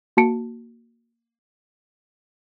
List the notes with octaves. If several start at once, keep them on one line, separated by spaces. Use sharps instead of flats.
A#3 F#4 A5 C#7 D7